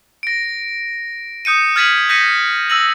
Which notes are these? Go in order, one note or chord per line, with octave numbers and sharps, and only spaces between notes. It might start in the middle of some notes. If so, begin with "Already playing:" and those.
A#6 D7
D#6 G6 C#7 D#7
F6 G#6 A6 B6 D#7 F#7
G6 A#6 B6 C#7 D#7
E6 A#6 D#7 F#7